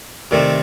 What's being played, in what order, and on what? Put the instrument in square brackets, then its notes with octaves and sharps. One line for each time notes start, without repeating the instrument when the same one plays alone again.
[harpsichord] C3 D#3 A3 C4 [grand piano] A#4 D5